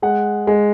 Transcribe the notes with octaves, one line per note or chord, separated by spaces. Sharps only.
G#3 F#5
G#3